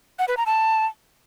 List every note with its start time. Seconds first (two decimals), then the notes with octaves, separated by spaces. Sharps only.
0.19 F#5
0.28 B4
0.37 A#5
0.46 A5